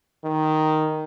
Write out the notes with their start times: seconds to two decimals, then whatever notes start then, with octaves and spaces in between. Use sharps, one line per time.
0.25 D#3